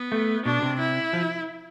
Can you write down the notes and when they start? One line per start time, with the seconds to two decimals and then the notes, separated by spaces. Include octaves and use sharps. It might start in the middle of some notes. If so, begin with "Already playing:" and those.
Already playing: B3
0.12 A3
0.45 B2 D4
0.62 C3
0.79 E4
1.13 F3